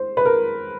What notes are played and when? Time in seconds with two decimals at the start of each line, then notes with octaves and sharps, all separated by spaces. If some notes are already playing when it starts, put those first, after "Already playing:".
Already playing: C5
0.17 B4
0.25 A#4